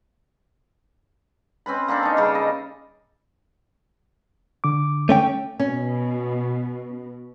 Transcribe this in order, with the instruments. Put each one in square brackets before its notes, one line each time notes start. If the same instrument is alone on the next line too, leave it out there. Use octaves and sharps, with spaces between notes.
[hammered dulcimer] C4 C#4 B4 B5
A#3 C4 D4 A4
C#4 D#4
C#3 G3
D#5
[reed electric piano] D3 D6
[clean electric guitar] A3 C#4 G5
[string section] B2 [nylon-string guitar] C#4